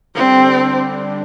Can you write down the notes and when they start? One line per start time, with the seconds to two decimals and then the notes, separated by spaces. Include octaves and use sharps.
0.15 D3 G3 C4 D4